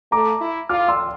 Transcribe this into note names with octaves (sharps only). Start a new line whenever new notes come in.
A3 A#5 D6
E4
F4 D6 F6
C6 E6